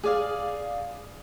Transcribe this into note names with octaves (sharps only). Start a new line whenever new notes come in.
G#4 D5 F5